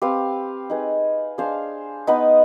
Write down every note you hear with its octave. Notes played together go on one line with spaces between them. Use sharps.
C4 G4 B4 F5
D#4 G#4 B4
D4 G#4 C5 F5
B3 D#4 B4 D#5